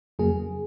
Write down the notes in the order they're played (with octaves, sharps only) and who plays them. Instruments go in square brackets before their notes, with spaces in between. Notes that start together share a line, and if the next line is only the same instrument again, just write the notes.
[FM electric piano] F2 C#3 F#3 A#3 G#4